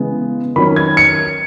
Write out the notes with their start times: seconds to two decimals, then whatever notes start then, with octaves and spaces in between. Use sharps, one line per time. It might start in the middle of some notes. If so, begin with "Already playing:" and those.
Already playing: C#3 E3 G#3 B3
0.56 D#3 F#3 C#4 B5
0.76 G#6
0.97 C#7